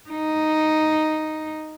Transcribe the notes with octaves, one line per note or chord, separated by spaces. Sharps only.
D#4